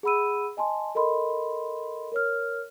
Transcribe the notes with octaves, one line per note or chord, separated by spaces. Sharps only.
G#4 F#5 B5 E6 D#7
D#5 G#5 A5 C6
A4 A#4 D#5 B5 C6
A#4 C#5 F6